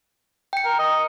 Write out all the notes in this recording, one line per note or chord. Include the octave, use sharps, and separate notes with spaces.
G5 C#7
A#4
D#5